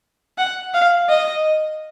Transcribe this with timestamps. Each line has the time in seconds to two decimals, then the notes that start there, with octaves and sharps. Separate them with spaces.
0.38 F#5
0.74 F5
1.09 D#5